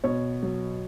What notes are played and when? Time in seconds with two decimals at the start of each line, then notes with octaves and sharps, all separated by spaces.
0.04 B2 C#5
0.43 F#3